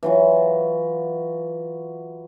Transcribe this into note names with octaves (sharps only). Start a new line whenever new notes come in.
E3 F#3 F4